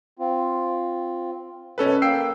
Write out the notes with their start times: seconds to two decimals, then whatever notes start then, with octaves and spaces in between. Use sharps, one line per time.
0.19 C4 F4
1.78 F#2 B2 C#4 A4 B4
2.02 A#3 G5 E6 C7